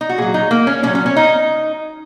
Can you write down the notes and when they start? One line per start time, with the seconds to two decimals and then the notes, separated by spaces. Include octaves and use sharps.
0.01 D#4
0.09 F#4
0.18 A#2 F#3 G#4
0.34 D#4
0.51 A#3
0.67 C#4
0.83 A#2 C#4
0.87 F#3
0.95 C#4
1.06 C#4
1.16 D#4